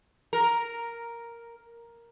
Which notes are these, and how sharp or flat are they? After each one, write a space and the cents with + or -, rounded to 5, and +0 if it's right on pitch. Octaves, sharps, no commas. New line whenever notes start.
A#4 +0